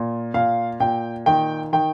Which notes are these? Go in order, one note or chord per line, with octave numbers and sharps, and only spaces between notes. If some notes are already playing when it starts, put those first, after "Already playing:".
Already playing: A#2
A#2 F5
A#2 G5
D#3 G5
D#3 G5